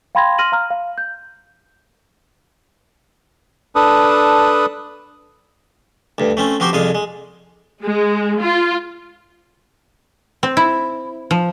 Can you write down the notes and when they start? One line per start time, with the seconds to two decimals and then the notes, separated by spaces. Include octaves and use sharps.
0.15 F5 G5 B5 C6 G#6 A#6
0.38 C6 F6 A#6 D#7 F#7
0.52 F5 A#5 F6
0.71 F5
0.98 G6
3.75 D4 A4 B4 D#6
6.18 D2 G2
6.37 A3 C4 C#4
6.60 F3 C4 F#4 G4 C5
6.73 C2 F2 G#3 G#4 F5
6.95 G#3
7.85 G#3
8.41 F4
10.43 C4
10.57 E4
11.31 F3